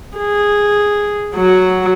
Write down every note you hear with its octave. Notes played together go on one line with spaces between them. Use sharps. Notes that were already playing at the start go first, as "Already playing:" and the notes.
G#4
F#3 F#4